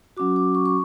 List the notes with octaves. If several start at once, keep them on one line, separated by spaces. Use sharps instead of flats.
F#3 C#4 F#4 D6
D6
C#6
C#6